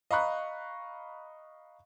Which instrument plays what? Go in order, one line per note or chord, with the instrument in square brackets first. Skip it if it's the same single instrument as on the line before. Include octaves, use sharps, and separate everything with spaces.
[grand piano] D#5 F5 A#5 B5 C#6 F#6